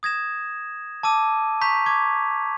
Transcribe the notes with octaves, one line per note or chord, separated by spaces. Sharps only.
D#6 G#6 A#6 E7
A5 D6 E6 D#7
A#5 C#6 G6 B6 F7
C#6 D6 G#6